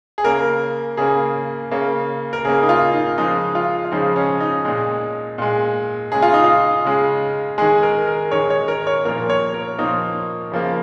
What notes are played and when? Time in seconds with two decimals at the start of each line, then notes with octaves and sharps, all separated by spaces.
0.18 G#4
0.24 C#3 A#3 A#4
0.97 C#3 A#3 G#4
1.71 C#3 A#3
2.33 A#4
2.45 C#3 A#3 G#4
2.63 D#4
2.69 F4
2.94 D#4
3.18 C#3 F3 G#3 D#4
3.55 F4
3.85 F4
3.92 C#3 F3 G#3 D#4
4.16 C#4
4.40 D#4
4.65 A#2 G#3 D#4
5.38 A#2 G#3
6.12 C#3 G#3 G#4
6.22 F4
6.33 D#4
6.44 F4
6.85 C#3 G#3
7.58 D#3 G#3 G#4
7.83 A#4
8.07 A#4
8.31 D#3 G#3 C#5
8.50 C#5
8.68 A#4
8.87 C#5
9.05 A#2 F3 A#3 A#4
9.30 C#5
9.54 A#4
9.78 A#2 F3 A#3 D#4
10.51 C#3 F3 A#3